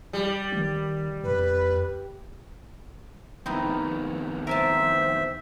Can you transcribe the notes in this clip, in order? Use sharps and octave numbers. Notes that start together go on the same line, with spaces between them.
G3
D#3
F2 B4
F2 D#3 B3 C4 D#4 E4
A#4 C5 E5 G#5 A5